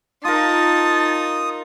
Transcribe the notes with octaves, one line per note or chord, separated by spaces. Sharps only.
D#4 F4 A#4 A5 D#6